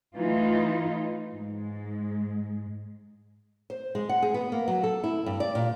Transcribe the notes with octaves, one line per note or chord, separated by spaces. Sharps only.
E3 A3 D#4 F4
G#2 G#3
C5
G#3
F#5
G#4
B3
A#3
F#3
A4
E4
G2
D5
A#2